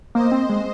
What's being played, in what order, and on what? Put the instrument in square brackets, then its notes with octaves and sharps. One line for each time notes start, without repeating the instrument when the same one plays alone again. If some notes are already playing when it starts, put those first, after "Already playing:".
[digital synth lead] A#3 [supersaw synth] C5 D#5
[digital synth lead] C4
G#3